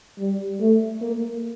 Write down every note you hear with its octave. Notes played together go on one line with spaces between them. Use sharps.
G3
A3
A#3